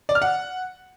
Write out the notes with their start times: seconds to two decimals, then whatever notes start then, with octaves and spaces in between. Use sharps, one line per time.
0.09 D5
0.15 F6
0.22 F#5